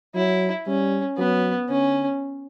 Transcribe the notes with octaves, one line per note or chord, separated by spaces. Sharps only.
F#3 E4
G3 C#4
F#3 B3
D3 C#4